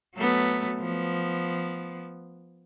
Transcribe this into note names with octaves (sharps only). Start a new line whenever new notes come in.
F#3 A3 B3
F3 B3